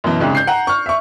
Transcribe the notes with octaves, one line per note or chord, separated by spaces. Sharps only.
F#2 B2 E3
C2 G#2 C#3
G6 C7
F#5 A#5
C#6 F6
E5 C#6